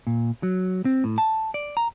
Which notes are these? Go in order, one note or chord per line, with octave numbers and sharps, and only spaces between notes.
A#2
F#3
C4
A2
A5
D5
A#5